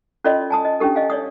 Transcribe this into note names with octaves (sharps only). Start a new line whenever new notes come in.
C#4 F4 A4 D5 D#5 C6
G#5 A5 D#6
D#5
C#4 D4 G4 A4
D#5 F5 G#5
C#5 D5 D#6